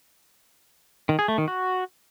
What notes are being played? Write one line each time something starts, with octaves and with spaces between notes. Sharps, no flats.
D#3
G#4
A3
D#3
F#4